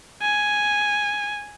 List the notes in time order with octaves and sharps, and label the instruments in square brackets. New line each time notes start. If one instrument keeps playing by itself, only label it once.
[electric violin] G#5